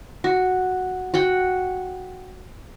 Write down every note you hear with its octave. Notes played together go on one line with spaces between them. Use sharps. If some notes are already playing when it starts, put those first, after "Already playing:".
F#4
F#4 F#5 G5